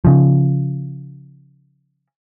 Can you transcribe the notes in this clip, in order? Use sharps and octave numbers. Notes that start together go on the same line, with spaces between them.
C#3 F3